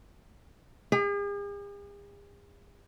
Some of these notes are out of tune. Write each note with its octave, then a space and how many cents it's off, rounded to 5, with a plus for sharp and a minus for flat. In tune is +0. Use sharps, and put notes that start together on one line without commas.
G#4 -45